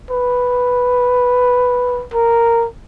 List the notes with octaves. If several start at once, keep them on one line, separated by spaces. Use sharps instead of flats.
B4
A#4